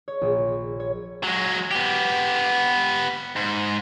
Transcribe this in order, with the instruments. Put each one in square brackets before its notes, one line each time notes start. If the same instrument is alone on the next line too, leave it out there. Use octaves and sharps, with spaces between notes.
[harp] C#5
A#1
C#5
[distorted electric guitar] F#3 G#3
B3 G4
G#2